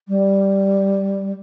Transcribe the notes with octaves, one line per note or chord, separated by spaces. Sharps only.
G3